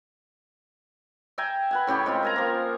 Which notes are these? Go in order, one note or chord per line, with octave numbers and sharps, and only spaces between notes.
E5 G5 G#5 A#5
B4 F#5 G#5
A2 C#3 G4 C#5
G#3 C4 F4
A#4 G#5 A#5
F3 A#3